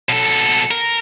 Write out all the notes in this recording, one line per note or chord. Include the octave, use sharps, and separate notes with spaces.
B2 A4
A#4